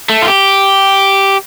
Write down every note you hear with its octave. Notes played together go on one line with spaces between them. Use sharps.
A3
F4
G4